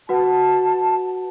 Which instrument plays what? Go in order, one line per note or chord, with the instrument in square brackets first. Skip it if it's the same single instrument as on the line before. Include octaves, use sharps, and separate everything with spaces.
[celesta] F#4 B4 F#5 [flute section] A5